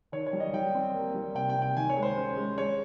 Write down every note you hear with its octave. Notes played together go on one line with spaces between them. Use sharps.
D#3 C#5
C#5
G3
D#5
G3 G5
C4
A#3
G3
C3 G5
G5
C3
G5
D#3 G#5
C#5
G#3
C5
C#4
G#3
G#3 C#5